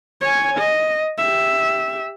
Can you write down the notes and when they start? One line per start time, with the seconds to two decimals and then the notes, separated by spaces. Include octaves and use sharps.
0.21 C#5 G#5
0.58 D#5
1.18 G4 E5